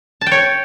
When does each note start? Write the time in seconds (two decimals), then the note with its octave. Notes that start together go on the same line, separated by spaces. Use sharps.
0.21 A5
0.26 G5
0.32 C#5